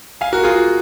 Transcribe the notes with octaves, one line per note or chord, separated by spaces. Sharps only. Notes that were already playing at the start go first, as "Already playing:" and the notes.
F5 G#5
F#4 A#4
F4 G#4
F#4